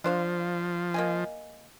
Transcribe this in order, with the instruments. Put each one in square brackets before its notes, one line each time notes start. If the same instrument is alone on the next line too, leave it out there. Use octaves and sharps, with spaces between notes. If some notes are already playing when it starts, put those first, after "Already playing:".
[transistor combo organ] F3 [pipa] D4 C5 F5
[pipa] A#3 D#5 G#5